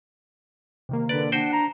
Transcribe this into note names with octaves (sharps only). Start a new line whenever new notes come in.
C3 D#3 A#3
D3 B4 D5
D4 F#4 C5 F#5 G5
A#5